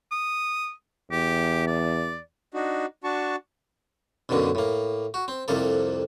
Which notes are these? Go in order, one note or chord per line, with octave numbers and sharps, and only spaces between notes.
D#6
E2 G4
D5
D4 D#4 F#4
D4 F#4 A5 C#6
B1 F#2 B2 D3 A#3
A2 A#3
F#4
C4
C2 F2 C3 A#3 A4